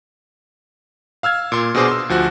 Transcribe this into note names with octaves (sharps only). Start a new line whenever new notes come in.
F5 E6 F6 G#6
A#2 C6
B2 D4 G#4 C5 D6
C6 E6
D2 F3 F#4 F#6